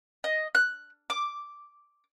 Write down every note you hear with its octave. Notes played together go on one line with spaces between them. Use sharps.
D#5
F#6
D6